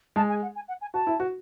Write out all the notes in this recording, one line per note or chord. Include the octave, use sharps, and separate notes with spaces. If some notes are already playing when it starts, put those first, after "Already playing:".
G#3 G#4 A5
G#5
F#5
G#5
F#5
G#5
F#4 A5
E4
F#4